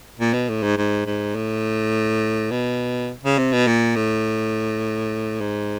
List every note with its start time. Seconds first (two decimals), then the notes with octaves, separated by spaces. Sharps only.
0.20 A#2
0.34 B2
0.49 A2
0.63 G#2
0.77 G#2
1.06 G#2
1.36 A2
2.51 B2
3.23 C#3
3.38 C3
3.52 B2
3.67 A#2
3.96 A2
5.41 G#2